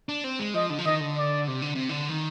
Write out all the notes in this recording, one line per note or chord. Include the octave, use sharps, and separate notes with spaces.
D4
C4
G#3
F3 D#5
D3
F3
D#3 D#5
D3
D5
C3
D3
C3
D3
D#3